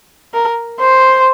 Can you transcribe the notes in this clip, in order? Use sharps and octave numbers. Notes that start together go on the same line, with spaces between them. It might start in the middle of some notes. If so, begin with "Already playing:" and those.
A#4
C5